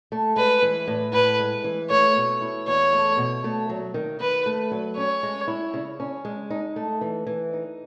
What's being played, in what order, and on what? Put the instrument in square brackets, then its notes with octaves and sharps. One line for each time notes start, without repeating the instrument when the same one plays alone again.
[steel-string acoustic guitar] A3
[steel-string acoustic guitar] G#3 [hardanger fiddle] B4
[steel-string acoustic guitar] E3
A2
[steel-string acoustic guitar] A2 [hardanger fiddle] B4
[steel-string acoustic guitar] G#3
E3
[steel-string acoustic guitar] A3 [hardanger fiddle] C#5
[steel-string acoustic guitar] B2
E4
[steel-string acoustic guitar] E2 [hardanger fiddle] C#5
[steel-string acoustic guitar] A3
B2
A3
F#3
D#3
[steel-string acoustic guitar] D#3 [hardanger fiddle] B4
[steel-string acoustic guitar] A3
F#3
[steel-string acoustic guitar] C#4 [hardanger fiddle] C#5
[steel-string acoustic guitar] G#3
E4
C#3
C#4
G#3
D#4
A3
E3
E3
D#4